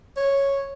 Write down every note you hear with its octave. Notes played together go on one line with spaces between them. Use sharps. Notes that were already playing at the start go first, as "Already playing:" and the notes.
C#5